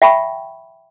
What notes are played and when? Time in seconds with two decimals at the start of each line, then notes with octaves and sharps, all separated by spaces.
0.02 E5 F#5 G5 A5 B5 C#6